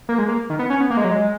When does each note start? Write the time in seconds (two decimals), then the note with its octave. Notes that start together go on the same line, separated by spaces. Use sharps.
0.09 A#3
0.18 G#3
0.28 A#3
0.50 D#3
0.59 B3
0.70 C#4
0.80 B3
0.90 A#3
0.97 G#3
1.04 F#3
1.11 G#3